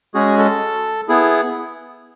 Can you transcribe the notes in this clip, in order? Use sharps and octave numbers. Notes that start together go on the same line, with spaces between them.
G#3 C#4 F#4 G#4
A4
B3 E4 G#4